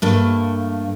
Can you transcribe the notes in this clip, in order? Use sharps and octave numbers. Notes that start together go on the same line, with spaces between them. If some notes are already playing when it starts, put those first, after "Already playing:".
G2 A3 A#3